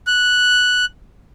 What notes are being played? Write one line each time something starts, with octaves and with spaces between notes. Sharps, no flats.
F#6